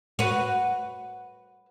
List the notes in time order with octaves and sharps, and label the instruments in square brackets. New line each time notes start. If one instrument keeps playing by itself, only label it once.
[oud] F#4 B4